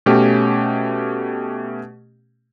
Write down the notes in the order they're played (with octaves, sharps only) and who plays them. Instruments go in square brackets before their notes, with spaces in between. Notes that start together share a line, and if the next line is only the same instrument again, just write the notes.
[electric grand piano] B2 A3 C#4 G4